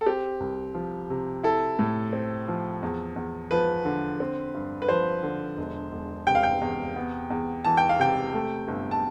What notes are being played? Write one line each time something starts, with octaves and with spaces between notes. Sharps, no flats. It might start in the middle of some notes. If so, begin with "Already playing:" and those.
A4
C4 G4
C2
F3
C3
E4 A4
A2
C4
F3
E2
E2
F3 B4
D3
C4
G2
B4
F3 C5
D3
E1
E1
C3 G5
F5
G5
E2
B3
E2
E3 A5
G5
F5
C3 G5
A3
G1
A5